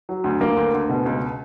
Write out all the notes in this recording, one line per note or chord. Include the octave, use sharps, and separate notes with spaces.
F#3
D2
D2 A#3
D2
D2
B2
C#2